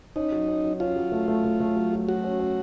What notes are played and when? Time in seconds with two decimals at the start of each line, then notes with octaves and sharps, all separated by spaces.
0.16 C#4 D#4
0.32 F#3
0.48 C#4
0.64 F#3
0.80 C#4 F4
0.96 F#3
1.12 A3
1.28 A3
1.44 A3
1.60 A3
1.76 F#3
1.92 F#3
2.08 F#3 F#4
2.24 C#4
2.40 C#4